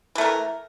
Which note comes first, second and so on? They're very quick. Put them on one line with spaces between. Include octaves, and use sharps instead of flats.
E3 A3 A#4